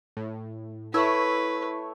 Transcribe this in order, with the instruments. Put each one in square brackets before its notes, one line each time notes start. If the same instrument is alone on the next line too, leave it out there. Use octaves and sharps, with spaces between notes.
[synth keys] A2
[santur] A3 C#5 E6 [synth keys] E4 [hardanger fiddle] B4